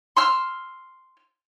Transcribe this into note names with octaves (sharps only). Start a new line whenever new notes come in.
C6 E6 F6